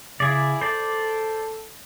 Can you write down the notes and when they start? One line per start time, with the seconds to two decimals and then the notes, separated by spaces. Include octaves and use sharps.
0.20 C#3 E4 G#4 D5
0.61 A4 C5 D5